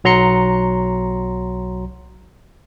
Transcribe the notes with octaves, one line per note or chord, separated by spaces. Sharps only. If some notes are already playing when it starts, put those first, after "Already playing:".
B1 F#3 A#5 C6 C#7